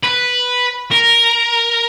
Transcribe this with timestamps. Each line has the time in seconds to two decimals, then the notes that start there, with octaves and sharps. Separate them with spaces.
0.03 B4
0.91 A#4